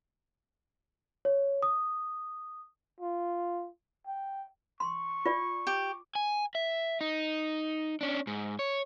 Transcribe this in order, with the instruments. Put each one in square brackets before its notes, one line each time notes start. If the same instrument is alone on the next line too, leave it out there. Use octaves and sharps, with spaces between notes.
[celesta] C#5
D#6
[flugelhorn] F4
G5
[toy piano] C6 [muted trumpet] C#6
[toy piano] F4 D5
[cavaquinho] G4
[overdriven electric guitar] G#5
E5
D#4
C#4 D4
G#2
C#5